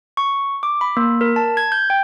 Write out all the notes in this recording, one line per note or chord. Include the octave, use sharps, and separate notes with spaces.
C#6
D6
B5
A#3
A#4
A5
G#6
G6
G5